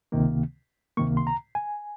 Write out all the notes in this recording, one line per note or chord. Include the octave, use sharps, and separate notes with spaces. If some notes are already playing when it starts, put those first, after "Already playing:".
C#2 C3 D#3 A#3
C#2 C3 D#3 A#3 C#6
C6
A#5
G#5